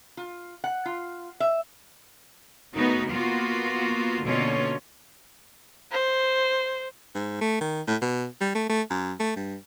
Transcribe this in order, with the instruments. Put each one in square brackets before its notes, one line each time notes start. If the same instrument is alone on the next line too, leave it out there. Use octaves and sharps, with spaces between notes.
[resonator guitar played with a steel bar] F4
F#5
F4
E5
[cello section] C#3 A3 B3 D#4 F#4 A#4
A#3 B3 F4 F#4
B2 D3 A#3 C#4 F4 C#5
[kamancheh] C5
[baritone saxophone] G#2
A3
D#3
A2
B2
G3
A3
A3
F#2
A3
G2